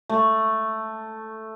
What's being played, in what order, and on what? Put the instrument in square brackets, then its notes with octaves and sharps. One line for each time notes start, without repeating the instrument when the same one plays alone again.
[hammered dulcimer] A3